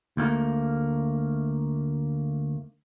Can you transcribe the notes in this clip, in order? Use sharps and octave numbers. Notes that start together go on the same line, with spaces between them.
D2 A3 A#3